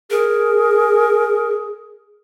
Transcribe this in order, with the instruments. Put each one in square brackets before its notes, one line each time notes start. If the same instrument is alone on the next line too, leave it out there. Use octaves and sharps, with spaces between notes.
[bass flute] G#4 [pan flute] A#4